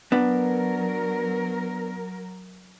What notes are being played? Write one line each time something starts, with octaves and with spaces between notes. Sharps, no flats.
F#3 B3 D4 A#4